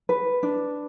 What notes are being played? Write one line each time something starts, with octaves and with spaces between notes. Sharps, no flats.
B4
D4